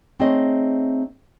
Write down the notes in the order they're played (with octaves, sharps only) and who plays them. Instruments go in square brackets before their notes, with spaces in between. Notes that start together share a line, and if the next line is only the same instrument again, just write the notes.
[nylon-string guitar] A3 C4 D#4 G#4 C#5 D#5